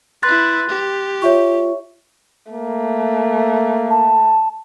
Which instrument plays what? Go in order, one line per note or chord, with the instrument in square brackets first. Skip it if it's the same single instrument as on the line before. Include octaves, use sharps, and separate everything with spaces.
[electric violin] E4 B4 [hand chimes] C6 F#6 A6
[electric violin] G4
[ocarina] F4 [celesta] C#5 E5 C#6
[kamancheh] A3 [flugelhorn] A#3
[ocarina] A5